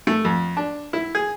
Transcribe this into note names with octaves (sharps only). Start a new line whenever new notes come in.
A3
F2
D4
E4
G#4